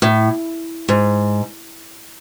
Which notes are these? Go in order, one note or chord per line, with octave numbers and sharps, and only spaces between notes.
A2
G#2